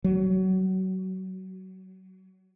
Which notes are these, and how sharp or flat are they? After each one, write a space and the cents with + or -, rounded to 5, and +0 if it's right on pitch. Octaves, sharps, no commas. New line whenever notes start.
F#3 +25